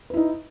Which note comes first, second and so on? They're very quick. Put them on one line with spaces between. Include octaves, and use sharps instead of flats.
B4 E4 D#4